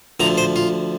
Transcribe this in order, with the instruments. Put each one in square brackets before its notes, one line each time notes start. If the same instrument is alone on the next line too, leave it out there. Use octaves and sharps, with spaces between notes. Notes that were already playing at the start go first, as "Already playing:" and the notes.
[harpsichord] D2 D3 F3 A#5
C5
F4